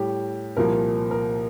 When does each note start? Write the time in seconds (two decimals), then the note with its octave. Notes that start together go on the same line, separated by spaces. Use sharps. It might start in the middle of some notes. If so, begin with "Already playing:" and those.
Already playing: A2 G3 G4
0.56 C2 A#2 F3 A#4
1.11 A#4